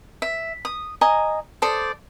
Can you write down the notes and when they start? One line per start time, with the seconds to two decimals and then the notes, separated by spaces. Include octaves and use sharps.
0.22 E5
0.65 D#6
1.01 D#5 G#5 A#5
1.62 A4 C5 D5 D#6